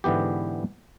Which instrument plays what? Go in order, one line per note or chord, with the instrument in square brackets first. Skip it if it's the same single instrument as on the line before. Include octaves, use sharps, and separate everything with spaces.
[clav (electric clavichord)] G#2 D3 E3 B3 G4